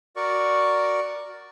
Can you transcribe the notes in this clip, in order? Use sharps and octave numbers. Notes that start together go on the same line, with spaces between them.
F#4 A#4 D5 C#6